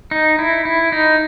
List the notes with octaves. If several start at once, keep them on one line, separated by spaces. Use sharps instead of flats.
D#4
E4
E4
D#4